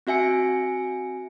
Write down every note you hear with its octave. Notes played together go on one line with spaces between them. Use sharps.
C4 F#4 E5 G#5 C#7